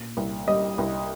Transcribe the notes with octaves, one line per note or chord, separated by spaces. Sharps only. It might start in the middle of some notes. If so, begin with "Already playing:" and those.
Already playing: A#2
C2
G3 D#5
C2